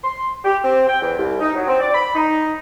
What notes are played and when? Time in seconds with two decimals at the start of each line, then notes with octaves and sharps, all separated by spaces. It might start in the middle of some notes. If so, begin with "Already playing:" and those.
0.04 C6
0.44 G4
0.63 C4
0.88 G5
1.02 E2
1.18 C2
1.41 D#4
1.54 F#3
1.67 C4
1.81 D5
1.94 B5
2.15 D#4